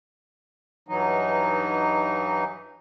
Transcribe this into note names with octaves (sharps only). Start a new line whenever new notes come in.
G2 E3 F#3 D#4